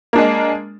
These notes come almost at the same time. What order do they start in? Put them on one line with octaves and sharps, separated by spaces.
A#3 D4 G#3